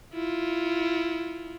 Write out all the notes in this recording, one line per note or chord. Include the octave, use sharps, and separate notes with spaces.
E4 F4